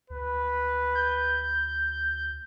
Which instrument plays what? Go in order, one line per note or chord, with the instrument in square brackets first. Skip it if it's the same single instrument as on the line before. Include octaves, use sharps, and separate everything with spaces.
[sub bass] D2 [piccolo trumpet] B4
[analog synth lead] G6